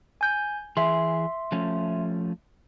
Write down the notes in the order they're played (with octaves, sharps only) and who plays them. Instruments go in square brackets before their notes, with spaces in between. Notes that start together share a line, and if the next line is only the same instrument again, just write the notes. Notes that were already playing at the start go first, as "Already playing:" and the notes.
[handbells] G#5 G6
[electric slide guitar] E3 G#4 [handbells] E5 C6
[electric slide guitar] F3 A3 C#4